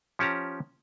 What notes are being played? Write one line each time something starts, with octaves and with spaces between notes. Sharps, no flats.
F3 C#4 G4 A5 A#5